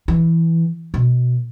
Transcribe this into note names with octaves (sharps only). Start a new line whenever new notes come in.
E3
B2